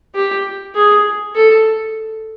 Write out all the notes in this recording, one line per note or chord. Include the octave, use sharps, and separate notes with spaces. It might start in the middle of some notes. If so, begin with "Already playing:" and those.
G4
G#4
A4